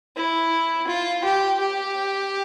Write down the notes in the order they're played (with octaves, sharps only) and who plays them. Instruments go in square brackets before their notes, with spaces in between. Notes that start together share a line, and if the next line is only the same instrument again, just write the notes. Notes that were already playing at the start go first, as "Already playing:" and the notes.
[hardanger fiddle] E4
F4
G4
G4